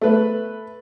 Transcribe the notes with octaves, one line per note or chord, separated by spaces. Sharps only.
A3 B4